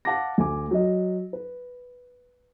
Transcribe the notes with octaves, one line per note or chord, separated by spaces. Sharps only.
F5 F#5 A5 D6 A#6
D2 G#5 D6
F#3 D#5
B4